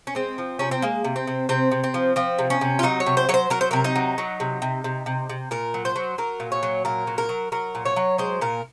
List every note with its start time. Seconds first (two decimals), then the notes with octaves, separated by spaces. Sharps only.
0.07 C#4
0.15 G#3 C4
0.38 F3
0.59 C3 C#4
0.71 C4
0.82 G#3 A#3
1.04 C3
1.16 C4
1.27 C3
1.49 C3 C4
1.72 C3
1.84 C4
1.94 F3
2.16 F3 C4
2.39 C3
2.50 C#4
2.61 C3
2.79 F4
2.83 F#3 D#4
3.00 C#5
3.06 C3
3.17 C5
3.29 F#3 C#5
3.34 C5
3.50 F#3 A#4
3.61 C5
3.71 C3 A#4
3.84 D#4
3.95 F#3
4.18 F#3
4.40 C3
4.62 C3
4.84 C3
5.06 C3
5.29 C3
5.51 A#2 A#4
5.74 F#3
5.85 C5
5.96 F#3
6.18 F#3 A#4
6.40 A#2
6.52 C#5
6.63 F#3
6.85 A#2 A#4
7.07 F#3
7.18 A#4
7.29 F#3
7.52 F#3 A#4
7.75 A#2
7.85 C#5
7.96 F#3
8.18 G#3 C5
8.41 A#2 A#4